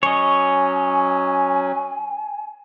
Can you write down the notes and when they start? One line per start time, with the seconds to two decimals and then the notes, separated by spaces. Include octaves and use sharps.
0.03 F#3 C#4 C#5 D#5 G#5